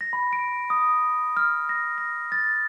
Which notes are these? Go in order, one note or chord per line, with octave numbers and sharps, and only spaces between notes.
A#6
B5
D7
D#6
F6
A#6
A#6
A6